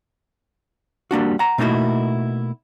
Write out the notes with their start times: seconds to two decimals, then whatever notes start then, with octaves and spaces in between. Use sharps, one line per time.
1.11 G3 A#3 D4 F#4
1.39 F#5 A#5
1.58 B2 A3 A#3 D#4 E4 F#4